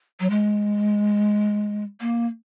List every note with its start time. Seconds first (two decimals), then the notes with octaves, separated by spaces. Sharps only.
0.20 F#3
0.30 G#3
2.01 A#3